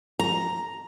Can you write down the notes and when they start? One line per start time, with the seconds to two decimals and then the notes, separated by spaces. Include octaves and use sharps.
0.19 A#5